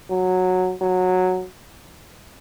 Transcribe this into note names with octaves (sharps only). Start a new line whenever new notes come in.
F#3
F#3